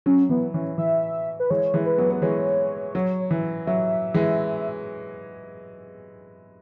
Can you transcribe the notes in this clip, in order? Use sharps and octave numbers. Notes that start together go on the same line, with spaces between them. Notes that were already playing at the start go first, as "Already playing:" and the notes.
F#3 C#4
E3 B3
E3 C#4
E3 E5
B4
E3 G#3 C#5
E3 G#3
B4
F#3 B3
B3 B4
E3 G#3 C#5
F#3
E3
F#3 E5
E3 G#3